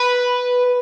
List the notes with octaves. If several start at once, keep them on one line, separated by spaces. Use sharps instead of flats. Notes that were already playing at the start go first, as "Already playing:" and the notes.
Already playing: B4